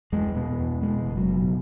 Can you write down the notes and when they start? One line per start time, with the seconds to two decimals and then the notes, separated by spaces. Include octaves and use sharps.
0.12 E2 G#3
0.36 B2
0.59 E2
0.82 B2 G#3
1.06 F#1
1.17 F#3
1.29 B2